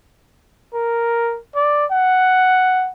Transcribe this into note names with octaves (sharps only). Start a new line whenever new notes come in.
A#4
D5
F#5